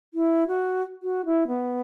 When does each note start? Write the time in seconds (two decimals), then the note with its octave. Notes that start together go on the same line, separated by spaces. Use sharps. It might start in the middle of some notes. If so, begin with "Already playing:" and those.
0.14 E4
0.47 F#4
1.03 F#4
1.25 E4
1.47 B3